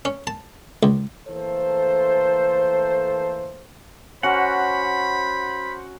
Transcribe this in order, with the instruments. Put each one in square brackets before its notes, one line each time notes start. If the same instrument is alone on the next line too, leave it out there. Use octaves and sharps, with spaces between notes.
[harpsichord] C#4
A5
C#2
[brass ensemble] E3 A3 A#3 A4 C5
[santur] C#4 F#4 A#4 [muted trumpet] C5 [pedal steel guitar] F#5 [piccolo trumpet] B5